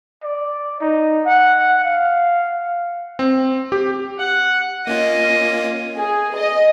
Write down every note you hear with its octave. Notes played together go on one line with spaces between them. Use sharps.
D5
D#4
F#5
F5
C4
G4
F#5
A#3 C#4 F4 D#5
G#4
D#5